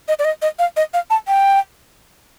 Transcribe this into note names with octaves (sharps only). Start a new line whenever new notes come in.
D#5
D5
D#5
D#5
F5
D#5
F5
A5
G5